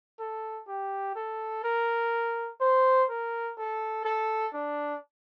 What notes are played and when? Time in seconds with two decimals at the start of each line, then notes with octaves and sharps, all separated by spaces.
0.19 A4
0.68 G4
1.16 A4
1.64 A#4
2.61 C5
3.09 A#4
3.58 A4
4.05 A4
4.53 D4